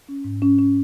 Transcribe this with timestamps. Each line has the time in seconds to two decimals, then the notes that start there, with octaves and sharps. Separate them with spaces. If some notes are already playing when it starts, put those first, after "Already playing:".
0.09 C#4
0.24 G#2
0.42 C#4
0.59 C#4